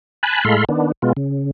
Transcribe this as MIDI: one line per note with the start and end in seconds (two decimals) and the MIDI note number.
0.23 0.44 80
0.23 0.44 81
0.23 0.44 83
0.23 0.44 90
0.45 0.65 45
0.45 0.65 56
0.45 0.65 69
0.45 0.65 77
0.45 0.65 83
0.45 0.65 84
0.69 0.92 51
0.69 0.92 59
0.69 0.92 62
1.02 1.13 47
1.02 1.13 56
1.02 1.13 59
1.02 1.13 65
1.17 1.51 49